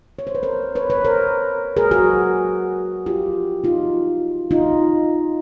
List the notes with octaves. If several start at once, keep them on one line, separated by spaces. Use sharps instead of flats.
C#5
C5
B4
A#4 C5
B4 C#5
B4 C#5
A#4 C5
G#4 A#4
F#4 G#4
F4 G4
D#4 F4
D#4 F4